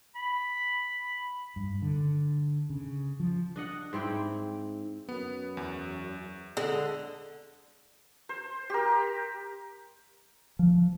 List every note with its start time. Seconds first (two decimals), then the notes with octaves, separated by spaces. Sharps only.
0.16 B5
1.56 G2
1.82 D3
2.70 C#3
3.20 F3
3.56 D4 D#5 F#5
3.93 G#2 C4 E4 G5
5.09 F#2 B3
5.57 E2
6.57 D3 G#3
8.29 C5
8.70 G4 A#4
10.59 F3